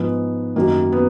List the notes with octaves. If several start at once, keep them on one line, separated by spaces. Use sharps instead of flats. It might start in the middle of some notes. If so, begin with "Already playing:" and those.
Already playing: G#2 F3 G#3 B3
F#2 D#3 F#3 A#3
B3